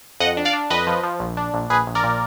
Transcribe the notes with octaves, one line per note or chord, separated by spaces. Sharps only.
F2 D#5 F#5
D4
D5 F5
D4
F2 B4 D#5
F3
F3
A#1
D4
A#1
A#1 G#4 B4
A#1
A#4 D5
A#2